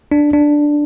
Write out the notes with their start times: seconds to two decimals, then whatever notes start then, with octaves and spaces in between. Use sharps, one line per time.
0.12 D4
0.33 D4